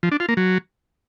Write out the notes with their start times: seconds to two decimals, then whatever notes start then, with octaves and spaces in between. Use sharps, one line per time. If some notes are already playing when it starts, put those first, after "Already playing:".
0.03 F3
0.12 D4
0.20 F4
0.29 A#3
0.37 F#3